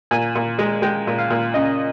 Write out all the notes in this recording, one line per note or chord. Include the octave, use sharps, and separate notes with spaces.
A#2 G#5
A#2
G#3
G#3 G5
A#2
F5
A#2
C#3 D#5